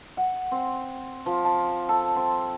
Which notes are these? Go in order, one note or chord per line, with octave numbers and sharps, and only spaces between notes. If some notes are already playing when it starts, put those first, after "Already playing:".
F#5
C4
F3
A5
A4
C4